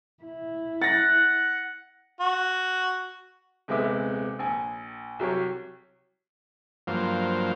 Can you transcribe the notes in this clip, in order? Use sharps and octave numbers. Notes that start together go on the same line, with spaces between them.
E4
F#5 A6 A#6
F#4
D#1 C3 G#3 B3 E5 D6
A#1 G#5
C2 F#3 G4 C#5
G2 F3 F#3 A#3 C5 F5